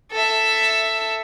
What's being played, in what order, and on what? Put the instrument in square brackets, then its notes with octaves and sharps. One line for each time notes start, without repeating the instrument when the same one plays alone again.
[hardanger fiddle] A4 E5